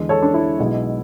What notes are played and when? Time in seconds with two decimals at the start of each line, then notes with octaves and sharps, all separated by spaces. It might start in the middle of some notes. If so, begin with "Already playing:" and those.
Already playing: E2 D3 G#3
0.09 A4 C#5
0.22 D4
0.34 E4
0.58 B1 B2 G#3